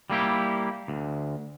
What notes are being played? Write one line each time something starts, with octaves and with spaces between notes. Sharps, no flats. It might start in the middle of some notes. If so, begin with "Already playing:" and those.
G3 A#3 E4 G4
D2